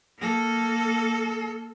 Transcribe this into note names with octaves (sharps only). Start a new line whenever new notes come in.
A#3 A4